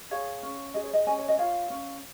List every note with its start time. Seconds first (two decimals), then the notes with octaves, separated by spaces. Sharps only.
0.11 G#4 C#5 F5
0.43 C#4
0.74 G#4 D#5
0.84 C#5
0.93 D#5
1.06 C#4 D#5 G#5
1.19 C#5
1.28 D#5
1.38 F4 C#5 F5
1.70 C#4